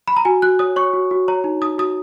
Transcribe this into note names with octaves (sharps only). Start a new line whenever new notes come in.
B5
A#5
F#4 G#5
F#4 F#6
C#5 D#6
C#5 C#6
F#4
F#4
C#5 A#5
D#4
D#4 D#6
F#4 D#6